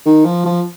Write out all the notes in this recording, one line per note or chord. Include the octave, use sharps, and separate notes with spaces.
D#3
F3
F3